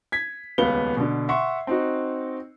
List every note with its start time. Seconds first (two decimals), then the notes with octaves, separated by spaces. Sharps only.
0.12 G#6 B6
0.58 D#1 C#2 B3 F5 G7
0.97 B2 D3
1.29 E5 F#5 C6 C#6
1.67 C4 D#4 F#4